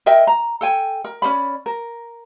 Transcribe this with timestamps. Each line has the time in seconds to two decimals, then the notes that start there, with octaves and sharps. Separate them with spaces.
0.06 A#4 D#5 E5 G5
0.27 A#5
0.61 A4 G5 G#5
1.04 A#4
1.22 C#4 C5 D5 B5
1.66 A#4